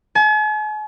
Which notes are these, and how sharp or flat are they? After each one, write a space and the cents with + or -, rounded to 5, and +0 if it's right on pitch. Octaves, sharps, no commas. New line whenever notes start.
G#5 +45